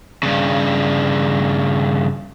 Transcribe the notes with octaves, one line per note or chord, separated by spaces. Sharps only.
G2 C#3